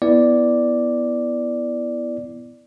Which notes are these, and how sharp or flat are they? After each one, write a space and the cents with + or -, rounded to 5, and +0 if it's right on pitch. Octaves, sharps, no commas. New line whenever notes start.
B3 +0 E4 +0 D5 +0